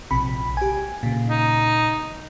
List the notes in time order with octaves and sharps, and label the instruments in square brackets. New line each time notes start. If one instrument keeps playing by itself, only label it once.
[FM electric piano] A#1 C3 B5
G4 G#5
A#2 C#3
[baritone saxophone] D#4